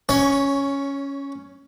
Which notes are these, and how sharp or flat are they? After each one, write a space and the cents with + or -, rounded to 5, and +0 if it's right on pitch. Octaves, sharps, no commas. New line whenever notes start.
C#4 +0 C#5 +20